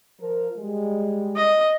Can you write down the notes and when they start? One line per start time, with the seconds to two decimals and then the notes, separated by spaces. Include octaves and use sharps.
0.18 F3 A#4
0.57 G3 G#3
1.36 D#5